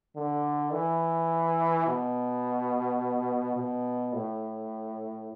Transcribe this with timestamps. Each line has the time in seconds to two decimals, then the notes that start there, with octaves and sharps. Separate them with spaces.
0.16 D3
0.73 E3
1.87 B2
3.56 B2
4.14 A2